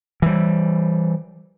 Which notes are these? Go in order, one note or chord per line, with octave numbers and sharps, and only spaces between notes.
E3 G3